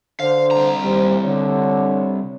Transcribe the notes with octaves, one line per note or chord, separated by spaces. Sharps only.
D3 C5 F5
C2 A#5
D#2 G3 C5
D3 C#5